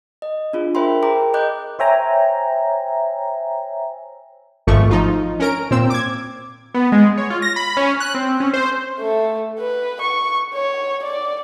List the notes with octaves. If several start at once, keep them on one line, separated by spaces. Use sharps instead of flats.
D#5
D4 F4 G#4
A#4 C5 E5 G5 B5 C6
G#4 A#4 G5 A#5 D6
D#5 D6 F#6 G6
C5 C#5 E5 G5 G#5 A#5
G#1 G#2 F3 A3 C#6
F3 D#4 F4
C#4 A#4 D7
A#2 C4 E6
D6 G#6
B3
G#3
C#5
F4
A#6
B5
C#4
F#6
C4
C#4
C5
A3
B4
C#6
C#5
D5